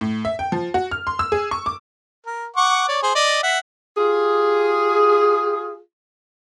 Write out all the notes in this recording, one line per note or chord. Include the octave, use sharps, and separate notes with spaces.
A2
E5
G5
F3
F#4
F6
C6
E6
G#4
C#6
D6
A#4
F#5 C#6 D6
C#5 D5
G#4 C5
D5 D#5
E5 F#5
F4 G4 G#4